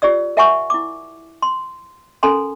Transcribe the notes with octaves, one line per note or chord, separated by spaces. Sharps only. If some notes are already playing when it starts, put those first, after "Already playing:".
F4 G4 C#5 D5 E6
A#4 E5 F#5 G#5 B5 C#6
E4 D6
C6
C#4 A4 A#4 G#5 A#5 C6